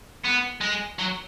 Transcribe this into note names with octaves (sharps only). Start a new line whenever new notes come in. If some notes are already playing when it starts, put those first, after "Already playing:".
B3
G#3
F#3